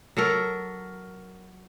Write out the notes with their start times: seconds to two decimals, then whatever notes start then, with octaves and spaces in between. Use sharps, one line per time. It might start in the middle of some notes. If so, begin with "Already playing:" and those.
0.17 F#3 A4 A#4